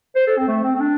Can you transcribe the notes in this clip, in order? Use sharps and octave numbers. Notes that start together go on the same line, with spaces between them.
C5
A4
C4
A3
C4
C4
D4